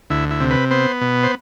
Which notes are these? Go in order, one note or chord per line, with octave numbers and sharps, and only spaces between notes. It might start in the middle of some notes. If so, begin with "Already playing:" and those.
D2 E4
E4
C3
B4
B3 C5
B2
C5